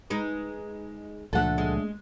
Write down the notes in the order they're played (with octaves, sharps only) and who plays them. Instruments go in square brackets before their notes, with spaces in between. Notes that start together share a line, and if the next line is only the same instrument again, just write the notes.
[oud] G#3 D#4 B4
[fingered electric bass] C#2 A#2 F3 [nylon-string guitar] A3 D4 [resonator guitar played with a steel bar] A4 F#5
[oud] G#3